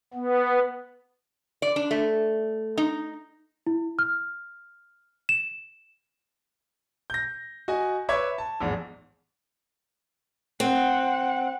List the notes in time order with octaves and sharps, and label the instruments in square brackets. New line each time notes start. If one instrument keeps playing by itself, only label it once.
[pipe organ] B3
[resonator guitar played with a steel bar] D5
D4
A3
D#4
[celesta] E4
F6
E7
[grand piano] G6 A#6
F#4 D#5 G#5
B4 C#5 E5 C#6 D6 G#6
A5
A#1 E2 G#2
[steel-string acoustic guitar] C4 [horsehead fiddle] F#5